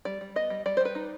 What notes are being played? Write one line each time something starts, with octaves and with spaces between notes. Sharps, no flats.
G3 D5
G3
B3 D#5
G3
G3 D5
C5
G3 B4
D#4